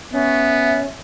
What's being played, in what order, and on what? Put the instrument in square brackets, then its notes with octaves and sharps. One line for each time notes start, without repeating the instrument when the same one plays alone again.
[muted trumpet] B3 [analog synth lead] C#4 [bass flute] E5